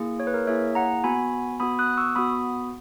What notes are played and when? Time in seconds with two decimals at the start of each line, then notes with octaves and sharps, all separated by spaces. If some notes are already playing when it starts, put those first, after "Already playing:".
Already playing: A#3 E4 G#4
0.20 C#5
0.27 B4
0.34 A#4 C#5
0.47 A#3 E4 G#4 C#5 E5
0.75 F#5 A#5
1.04 B3 F#4 G#5 B5
1.60 B3 F#4 B5 D#6
1.79 D#6 F#6
1.97 C#6 E6
2.16 B3 F#4 B5 D#6